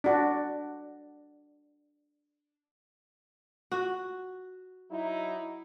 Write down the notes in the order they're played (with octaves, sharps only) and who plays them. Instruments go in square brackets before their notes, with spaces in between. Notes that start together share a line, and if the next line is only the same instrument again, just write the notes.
[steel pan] D4 F#4
[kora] F#4
[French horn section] F#3 D#4 E4